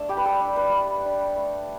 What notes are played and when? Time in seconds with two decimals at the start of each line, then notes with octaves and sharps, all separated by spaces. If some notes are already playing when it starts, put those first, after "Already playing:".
Already playing: A3 D4 A4
0.09 G3 G4
0.17 B4
0.25 A4
0.40 D4
0.56 B4
0.73 G3
1.05 D4
1.36 A3